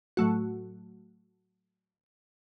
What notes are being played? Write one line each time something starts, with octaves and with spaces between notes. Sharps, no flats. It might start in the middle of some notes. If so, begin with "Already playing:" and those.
A2 F#3 A3 F#4